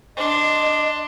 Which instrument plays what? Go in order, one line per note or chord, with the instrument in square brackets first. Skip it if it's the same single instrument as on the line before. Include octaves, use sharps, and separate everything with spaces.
[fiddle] D4 C6 [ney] D#5